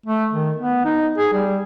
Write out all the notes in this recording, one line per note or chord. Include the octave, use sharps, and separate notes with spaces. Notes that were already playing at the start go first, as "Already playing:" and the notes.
A3
D#3
B3
D#4
G#4
G3